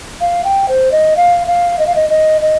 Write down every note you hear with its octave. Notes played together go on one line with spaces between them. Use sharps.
F5
G5
C5
D#5
F5
F5
D#5
F5
D#5
D#5
D#5